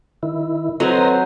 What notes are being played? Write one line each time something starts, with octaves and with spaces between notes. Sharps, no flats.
D#3 E4
F#3 C4 A4 B4 C5 D#5 A#5 C6